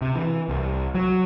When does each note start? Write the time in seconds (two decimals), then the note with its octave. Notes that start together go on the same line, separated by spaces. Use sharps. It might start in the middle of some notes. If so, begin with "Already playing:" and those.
0.02 C3
0.15 E3
0.48 C2
0.95 F#3